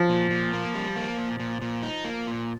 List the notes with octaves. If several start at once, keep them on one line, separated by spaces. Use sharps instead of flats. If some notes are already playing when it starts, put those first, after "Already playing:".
Already playing: F3
A#2
A#2
A#3
G3
A#3
A#2
A#2
A#2
D#4
A#3
A#2